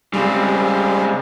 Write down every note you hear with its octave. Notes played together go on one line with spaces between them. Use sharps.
C#3 G3 G#3 C4